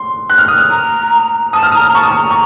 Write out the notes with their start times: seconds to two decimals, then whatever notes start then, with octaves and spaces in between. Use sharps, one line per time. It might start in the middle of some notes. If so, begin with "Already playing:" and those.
Already playing: C6
0.30 F#6
0.38 F6
0.48 D#6
0.58 F6
0.71 A#5
1.53 A5 D#6
1.63 F6
1.72 A#5 D#6
1.88 A#5
1.95 A5 C#6
2.03 D#6
2.12 A#5 C#6
2.31 C#6